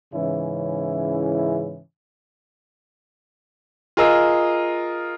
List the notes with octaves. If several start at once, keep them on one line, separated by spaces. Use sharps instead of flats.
G#2 C#3 E3 C#4 E4
F4 G#4 A#4 D#5 E6